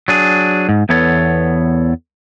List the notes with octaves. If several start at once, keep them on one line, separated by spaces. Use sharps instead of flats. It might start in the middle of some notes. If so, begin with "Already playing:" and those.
F#3 D4 G#4
G#2
E2 E3 B3 A4 C#5